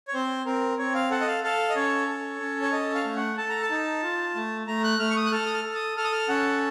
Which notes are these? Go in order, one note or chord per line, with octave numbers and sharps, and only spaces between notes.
C#5
C4 C5
C4 A#4
C4 C#5
F5
A4 F#5
D#5
F5
A4 F5
D#5
C#4 C#5
A4
C#4
C#5
A4 D#5
F5
A3
F#5
A4 A5
A#5
A5
D#4
F4
A3
A3 A#5
F#6
A3 F6
C#6
D#6
F#6
A4 F6
D#6
F6
A4
D#6
A4 F6
D#6
F6
C#4 F#5